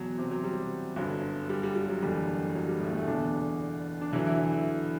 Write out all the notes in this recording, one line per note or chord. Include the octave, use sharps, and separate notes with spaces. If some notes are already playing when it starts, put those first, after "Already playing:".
Already playing: E2 B2 F#3
C3 C4
F#3
G3
G1 F#2 D3 F#3
G3
G3
G3
F#3
F#1 E2 D3 G3
F#3
G3
A2 A3
A2 A3
E1 E2 B2 D3 D4
D4
E2 D3 E3 F#3 E4
E3 E4
E3 E4
E3 E4